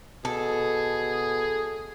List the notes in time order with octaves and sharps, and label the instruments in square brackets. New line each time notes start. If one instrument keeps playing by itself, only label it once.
[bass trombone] B2 [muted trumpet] G#4 [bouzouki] A4